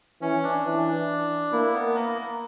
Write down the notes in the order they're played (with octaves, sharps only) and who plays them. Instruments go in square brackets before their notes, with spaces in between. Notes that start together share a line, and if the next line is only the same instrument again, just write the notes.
[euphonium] E3 [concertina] C#4
[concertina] D4
[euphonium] E3
[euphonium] A#3 [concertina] E4
[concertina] B3
A#3